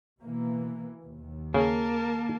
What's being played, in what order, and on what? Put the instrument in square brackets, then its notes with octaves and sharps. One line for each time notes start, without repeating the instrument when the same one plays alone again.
[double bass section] B2 E3 A#3
D#2
[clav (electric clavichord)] C#3 [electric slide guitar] A#3 [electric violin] A#4 A5